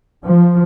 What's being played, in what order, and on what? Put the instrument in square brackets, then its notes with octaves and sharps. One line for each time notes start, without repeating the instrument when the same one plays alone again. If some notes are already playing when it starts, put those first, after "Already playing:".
[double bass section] F3